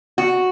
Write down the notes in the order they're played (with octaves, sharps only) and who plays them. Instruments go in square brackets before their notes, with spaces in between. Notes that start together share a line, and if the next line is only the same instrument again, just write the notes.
[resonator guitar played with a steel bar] F#4